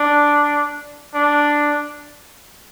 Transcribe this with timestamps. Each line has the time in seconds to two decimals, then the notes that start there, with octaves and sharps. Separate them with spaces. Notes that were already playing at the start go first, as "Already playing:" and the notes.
Already playing: D4
1.14 D4